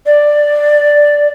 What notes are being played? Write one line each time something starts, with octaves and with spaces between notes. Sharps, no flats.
D5